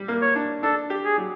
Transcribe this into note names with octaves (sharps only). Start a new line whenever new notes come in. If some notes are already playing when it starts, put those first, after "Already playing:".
Already playing: G3
A#3
C#5
D4
D4 A4
G4
G#4
F#3